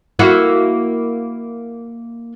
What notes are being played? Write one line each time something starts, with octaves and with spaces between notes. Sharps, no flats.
A#3 E4 F#4